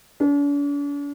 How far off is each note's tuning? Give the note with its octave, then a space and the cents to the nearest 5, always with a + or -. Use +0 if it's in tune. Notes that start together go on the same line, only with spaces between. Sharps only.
D4 -45